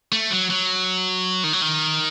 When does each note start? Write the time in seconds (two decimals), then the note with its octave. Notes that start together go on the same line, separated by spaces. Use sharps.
0.12 A3
0.31 F#3
0.50 F#3
1.44 D#3
1.53 F#3
1.62 D#3